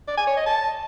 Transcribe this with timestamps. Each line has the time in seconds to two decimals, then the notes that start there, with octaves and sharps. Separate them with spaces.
0.08 D5
0.17 G#5
0.27 C#5
0.37 D#5
0.46 A5